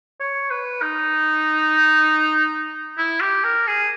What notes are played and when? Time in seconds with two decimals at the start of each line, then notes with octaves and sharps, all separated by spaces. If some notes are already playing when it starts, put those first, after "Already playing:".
0.20 C#5
0.51 B4
0.82 D#4
2.98 E4
3.21 G4
3.44 A#4
3.67 G#4